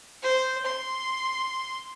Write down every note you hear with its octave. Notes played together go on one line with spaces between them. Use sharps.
C5
C6